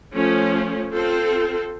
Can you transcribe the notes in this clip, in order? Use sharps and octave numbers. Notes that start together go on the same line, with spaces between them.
F3 A3 C#4
C4 F4 A4 C5